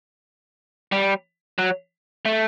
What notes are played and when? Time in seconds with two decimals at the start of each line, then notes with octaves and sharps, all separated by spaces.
0.92 G3
1.59 F#3
2.26 A3